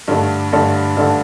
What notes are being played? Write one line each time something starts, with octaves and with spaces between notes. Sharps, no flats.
G2 D3 A3 D4 A4
G2 D3 A3 D4 A4
G2 D3 A3 D4 A4